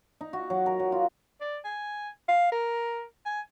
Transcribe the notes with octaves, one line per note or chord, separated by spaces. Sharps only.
D#4
F#4
F#3
A#4
F#3
F4
D5
G#5
F5
A#4
G#5